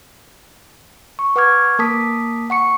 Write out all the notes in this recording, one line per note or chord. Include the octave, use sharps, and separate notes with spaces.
C#6
B4 F#5 C#6 D6 F6 G#6
A#3 A#4 A5 D6 D#6 B6
F#5 C#6 C#7